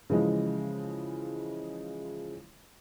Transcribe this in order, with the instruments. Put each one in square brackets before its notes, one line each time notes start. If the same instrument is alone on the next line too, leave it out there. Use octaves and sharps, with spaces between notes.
[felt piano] C#3 E3 F3 G#3